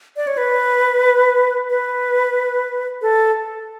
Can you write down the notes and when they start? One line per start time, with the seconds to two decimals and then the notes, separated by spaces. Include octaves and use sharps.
0.16 D5
0.27 C#5
0.37 B4
1.70 B4
3.02 A4